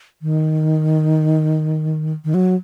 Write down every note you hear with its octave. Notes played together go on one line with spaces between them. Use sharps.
D#3
D#3
F#3